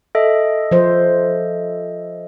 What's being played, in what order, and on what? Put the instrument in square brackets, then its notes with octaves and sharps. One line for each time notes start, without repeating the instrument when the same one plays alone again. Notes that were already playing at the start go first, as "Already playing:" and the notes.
[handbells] A4 D#5 E5
[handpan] F3 C5